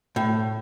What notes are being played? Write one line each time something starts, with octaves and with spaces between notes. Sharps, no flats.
A2